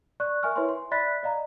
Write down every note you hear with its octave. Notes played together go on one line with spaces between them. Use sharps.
D5 C#6 F#6
A#4 E5 G#5 C#6 F6
E4 B4 C#5 E5 G#5 C6
C6
D5 E5 B5 F#6 A6 B6
D5 D#5 F5 A#5